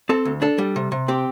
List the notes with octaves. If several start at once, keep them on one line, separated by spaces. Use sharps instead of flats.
C4 A4
D2
D4 A4
G3
C3
C3
C4 G4